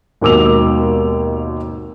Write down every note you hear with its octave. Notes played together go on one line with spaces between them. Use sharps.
G#1 D#2 B2 D6 E6 F7